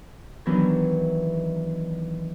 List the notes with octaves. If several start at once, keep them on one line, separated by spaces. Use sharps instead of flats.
D#3 E3 F#3 B3 D4 E4